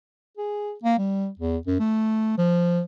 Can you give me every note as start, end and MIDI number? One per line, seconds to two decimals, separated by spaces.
0.37 0.72 68
0.83 0.96 58
0.98 1.28 55
1.39 1.57 40
1.67 1.77 42
1.79 2.37 57
2.38 2.81 53